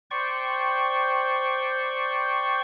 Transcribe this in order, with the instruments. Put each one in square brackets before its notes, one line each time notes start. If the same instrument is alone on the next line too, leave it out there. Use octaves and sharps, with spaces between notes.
[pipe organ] C5 D5 G5 C#6